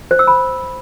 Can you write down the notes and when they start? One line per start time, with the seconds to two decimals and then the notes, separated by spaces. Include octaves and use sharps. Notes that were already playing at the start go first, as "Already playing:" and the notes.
0.11 C5
0.19 E6
0.27 B5